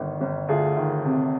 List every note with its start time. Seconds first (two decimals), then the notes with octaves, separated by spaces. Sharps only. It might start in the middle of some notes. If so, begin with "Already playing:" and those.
Already playing: G1 D#3
0.21 G1
0.48 D2 F4 G#4
0.77 D#3
1.05 C3